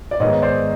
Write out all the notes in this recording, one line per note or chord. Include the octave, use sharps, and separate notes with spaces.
D5
G#2 D#3 G#3 B3 C#5 D#5
C5 D5